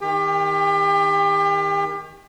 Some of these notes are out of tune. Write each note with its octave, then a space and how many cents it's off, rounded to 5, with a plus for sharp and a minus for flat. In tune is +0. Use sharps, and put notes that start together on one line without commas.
D#3 +15 G4 +35 G5 +40